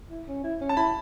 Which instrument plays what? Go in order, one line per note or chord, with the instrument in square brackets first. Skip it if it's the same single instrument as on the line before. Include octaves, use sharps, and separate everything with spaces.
[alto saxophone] E4
C#4
E4
C#4
[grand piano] A5
[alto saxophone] E4 [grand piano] B5